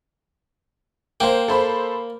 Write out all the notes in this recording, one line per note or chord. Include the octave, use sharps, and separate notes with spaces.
A#3 C5 G5
A4 C5 B5